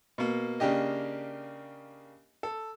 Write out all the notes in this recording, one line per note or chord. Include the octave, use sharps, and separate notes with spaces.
B2 A#3
C#3 A#3 D4 G4 D#5
A4